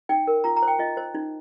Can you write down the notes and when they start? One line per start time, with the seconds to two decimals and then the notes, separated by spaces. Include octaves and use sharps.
0.09 D#4 G5
0.27 A#4
0.44 F4 A#5
0.56 A#5
0.63 C5 G5
0.79 F4 D#5
0.97 C5
1.14 D#4